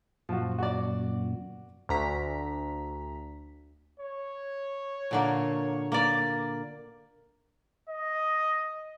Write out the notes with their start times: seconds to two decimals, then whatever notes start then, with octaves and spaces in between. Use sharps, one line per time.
0.29 F#2 A#2 F3 F#4
0.59 F#4 D5
1.89 D2 A#5 B6
3.99 C#5
5.11 A#2 D3 A#3
5.92 A#3 D5
7.90 D#5